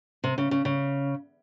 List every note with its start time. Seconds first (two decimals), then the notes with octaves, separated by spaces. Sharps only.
0.24 C3
0.38 C#3
0.51 C#3
0.65 C#3